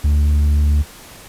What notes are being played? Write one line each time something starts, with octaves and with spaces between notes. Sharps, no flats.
D2